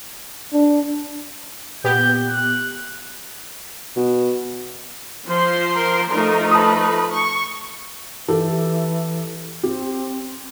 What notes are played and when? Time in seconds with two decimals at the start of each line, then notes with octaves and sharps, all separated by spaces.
0.53 D4
1.84 A#2 B3 G4 G6
2.30 F#6
3.96 B2
5.26 F3 C5 C6
5.76 A#4
6.11 F3 A3 D#4 A#4
6.51 B4 A5 D#6
7.12 C#6
8.28 E3 G4 A4
9.63 C4 G4